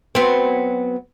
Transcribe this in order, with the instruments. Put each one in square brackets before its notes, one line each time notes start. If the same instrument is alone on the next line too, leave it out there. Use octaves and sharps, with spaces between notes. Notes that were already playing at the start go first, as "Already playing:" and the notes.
[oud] F#3 B3 C4